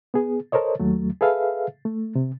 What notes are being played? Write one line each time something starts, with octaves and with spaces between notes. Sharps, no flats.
B3 G#4
A4 A#4 C5 C#5 D#5
D#2 F#3 A3
G#4 A4 B4 E5 F5
A3
C3